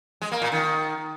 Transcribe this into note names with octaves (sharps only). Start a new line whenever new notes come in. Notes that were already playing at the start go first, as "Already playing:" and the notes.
G#3
A#3
A#2
D#3